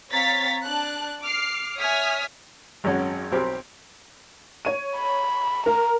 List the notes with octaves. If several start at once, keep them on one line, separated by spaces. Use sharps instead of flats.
C4 C#5 F5 A#5 A6 B6
D4 A5 F#6
D6 F6 C7
C#5 E5 G#5 D#6 F6 B6
G#1 F#2 C#4 F#4
B1 C4 G4 A#4
C#5 D#7
B5
A#4 A#5